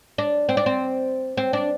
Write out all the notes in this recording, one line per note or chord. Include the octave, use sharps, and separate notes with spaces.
D4
C4
D4
C4
C4
D4